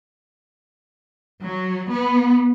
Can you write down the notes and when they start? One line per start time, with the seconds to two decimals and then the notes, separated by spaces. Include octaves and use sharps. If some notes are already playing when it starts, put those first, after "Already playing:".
1.43 F#3
1.91 B3